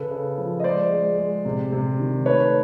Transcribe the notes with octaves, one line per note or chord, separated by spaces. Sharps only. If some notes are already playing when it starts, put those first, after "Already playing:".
Already playing: C#3 A4 B4
C#3
F3
D#5
G#3 C5 D5
G#3
G#3
C3
C3
D#3
A3 B4 C#5